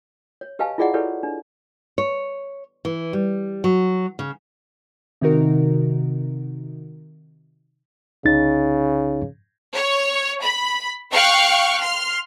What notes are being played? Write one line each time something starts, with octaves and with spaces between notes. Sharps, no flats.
C#5
G4 B4 D#5 F5 G#5 A5
E4 F4 G#4 D5 D#5 F#5
E4 G4 A4 B4 C#5 D5
D4
C#5
E3
G3
F#3
C#3
C3 D#3 D#4 F#4 A#4
C2 C#3 D#4 A6
C#5
B5
F5 G5 C#6 F6 F#6
C6 F6